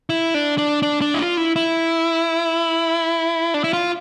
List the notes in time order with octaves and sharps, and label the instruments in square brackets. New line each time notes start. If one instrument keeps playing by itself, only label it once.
[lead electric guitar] E4
D4
D4
D4
D4
E4
F4
E4
E4
D4
E4
F4